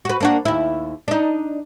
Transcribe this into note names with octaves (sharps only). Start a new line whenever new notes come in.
F#4 B4
A#3 D4 F#4
D#2 E4
D4 D#4